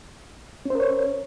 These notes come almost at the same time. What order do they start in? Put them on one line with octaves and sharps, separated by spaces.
C#4 C5 A#4 C#5